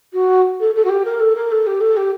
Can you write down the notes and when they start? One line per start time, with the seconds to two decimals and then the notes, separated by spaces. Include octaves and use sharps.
0.13 F#4
0.60 A4
0.75 A4
0.84 F#4
0.89 G4
1.05 A#4
1.19 A4
1.35 A#4
1.51 A4
1.66 G4
1.80 A4
1.96 G4